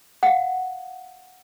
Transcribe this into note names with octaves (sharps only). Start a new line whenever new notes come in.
F5 F#5